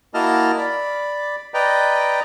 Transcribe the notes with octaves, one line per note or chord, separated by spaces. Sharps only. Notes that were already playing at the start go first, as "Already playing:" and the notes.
A#3 E4 F#4 D#5 A5 F6
D5 B5
B4 D5 D#5 G5 A#5